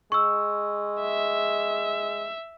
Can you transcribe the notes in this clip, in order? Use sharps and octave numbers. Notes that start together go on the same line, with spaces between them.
G#3 C#6 E6
E5